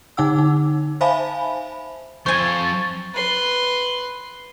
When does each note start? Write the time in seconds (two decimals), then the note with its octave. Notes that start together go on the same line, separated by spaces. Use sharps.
0.17 D3 D#4 F#5 E6
0.39 D#4
1.01 C5 E5 F5 G#5 A5 B5
2.26 F2 C5 G#5 C#6 A6
3.14 B4 C6